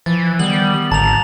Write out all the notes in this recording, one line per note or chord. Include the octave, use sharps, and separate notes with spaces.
E3 F3 A6
D#3 G3 B3 F#7
G#1 D3 A5 A#5 F7